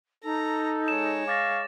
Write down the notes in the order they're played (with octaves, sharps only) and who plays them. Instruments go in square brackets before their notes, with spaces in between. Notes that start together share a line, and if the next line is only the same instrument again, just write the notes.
[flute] D#4 [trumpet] A4 [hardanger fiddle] A#5
[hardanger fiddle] G#3 C#5 [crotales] E7
[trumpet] F5 [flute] C#6 [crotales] D6 A6 A#6